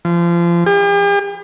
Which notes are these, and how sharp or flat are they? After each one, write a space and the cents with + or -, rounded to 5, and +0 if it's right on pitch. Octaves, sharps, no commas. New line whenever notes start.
F3 -30
G4 +45